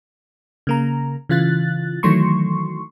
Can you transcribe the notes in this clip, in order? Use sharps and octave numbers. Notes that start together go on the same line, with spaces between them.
C#3 A#3 A#5
C#3 E3 F4 F#6 A6
D#3 E3 F#3 A3 C6 C#6